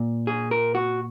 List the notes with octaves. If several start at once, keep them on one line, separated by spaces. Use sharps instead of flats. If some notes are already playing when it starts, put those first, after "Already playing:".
Already playing: A#2
G#4
A#4
F#4